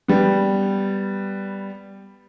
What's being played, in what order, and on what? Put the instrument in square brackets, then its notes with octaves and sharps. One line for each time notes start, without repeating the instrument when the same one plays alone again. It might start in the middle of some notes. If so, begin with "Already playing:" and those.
[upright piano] G3 B3